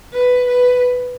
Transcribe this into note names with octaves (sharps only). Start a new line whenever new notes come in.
B4
B4